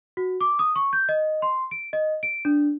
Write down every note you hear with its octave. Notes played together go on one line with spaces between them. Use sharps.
F#4
D6
D#6
C#6
G6
D#5
C6
D7
D#5
D7
D4